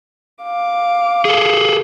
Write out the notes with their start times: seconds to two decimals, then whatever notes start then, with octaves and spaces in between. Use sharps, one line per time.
0.43 F5 D6
1.25 G#4 A4